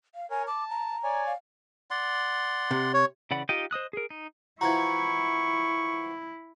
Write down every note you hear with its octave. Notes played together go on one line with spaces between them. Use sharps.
F5
A#4 C#5 G#5
A5 D6
A#5
C#5 D5 G#5
F5
D5 F#5 C6
C3
C#5
C#3 E3 D5 F#5 B5
D#4 F4 G4 D#5 G5
C5 D#5 D#6 F#6
G#4 A#4
D#4
E3 F3 E4 F#4 A#5 C#6 G#6